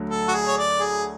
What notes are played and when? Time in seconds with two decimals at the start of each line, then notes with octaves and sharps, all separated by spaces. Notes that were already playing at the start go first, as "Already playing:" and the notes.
Already playing: D2 D3 F#3
0.10 A4
0.28 F#4
0.33 G#4
0.48 C#5
0.58 D5
0.80 G#4